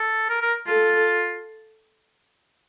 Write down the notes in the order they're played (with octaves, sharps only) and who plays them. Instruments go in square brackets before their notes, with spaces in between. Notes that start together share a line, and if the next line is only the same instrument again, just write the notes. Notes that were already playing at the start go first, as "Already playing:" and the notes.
Already playing: [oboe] A4
A#4
A#4
[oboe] F4 [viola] A4